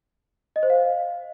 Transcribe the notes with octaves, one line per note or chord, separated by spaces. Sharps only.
D#5
C5
F5